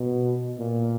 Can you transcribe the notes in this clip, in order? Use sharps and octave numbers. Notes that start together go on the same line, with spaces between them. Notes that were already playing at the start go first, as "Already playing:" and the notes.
Already playing: B2
A#2